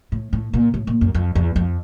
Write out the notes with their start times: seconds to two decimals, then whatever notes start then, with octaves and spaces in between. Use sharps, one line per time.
0.12 A2
0.33 A2
0.53 A#2
0.74 A2
0.87 A#2
1.01 F#2
1.14 F2
1.35 E2
1.56 F2